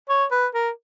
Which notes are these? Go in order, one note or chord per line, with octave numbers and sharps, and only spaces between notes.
C#5
B4
A#4